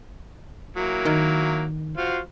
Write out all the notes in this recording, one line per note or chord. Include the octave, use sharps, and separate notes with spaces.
F#3 A#3 E4
D#3
F4 F#4 C5